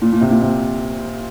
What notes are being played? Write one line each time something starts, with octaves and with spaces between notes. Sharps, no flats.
A#2
A#2
C3
A#2
C3